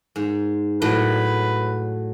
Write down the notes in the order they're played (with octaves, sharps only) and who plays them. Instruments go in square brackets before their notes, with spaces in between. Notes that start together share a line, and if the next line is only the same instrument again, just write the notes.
[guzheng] G#2
[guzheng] A2 F#3 [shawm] B4